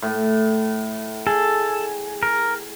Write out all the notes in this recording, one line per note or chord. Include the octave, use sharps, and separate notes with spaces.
A2
G#4 A4
A#4